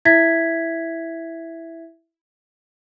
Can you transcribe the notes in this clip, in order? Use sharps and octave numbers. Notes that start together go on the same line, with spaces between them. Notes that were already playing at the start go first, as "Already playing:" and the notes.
E4 E5 G#6 B6